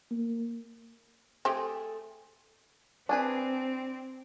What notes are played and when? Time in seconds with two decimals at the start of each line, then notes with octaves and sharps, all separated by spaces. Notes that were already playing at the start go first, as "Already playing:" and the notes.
0.11 A#3
1.45 A3 C4 G4 G#4
3.09 C4 D4 G#4 B4